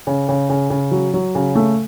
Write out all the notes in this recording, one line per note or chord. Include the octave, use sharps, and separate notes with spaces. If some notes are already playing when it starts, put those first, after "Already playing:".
C#3
C#3
C#3
C#3
F#3
F#3
C#3
A3